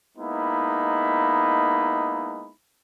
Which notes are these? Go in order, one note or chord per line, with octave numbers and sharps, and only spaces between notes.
G#3 A#3 B3 D#4 E4 B5